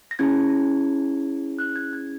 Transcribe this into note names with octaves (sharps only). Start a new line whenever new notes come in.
A#6
C#4 E4 G#4 G#6
F#6
G#6
G#6